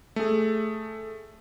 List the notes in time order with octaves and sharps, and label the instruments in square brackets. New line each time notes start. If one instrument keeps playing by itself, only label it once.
[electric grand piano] A3 G#4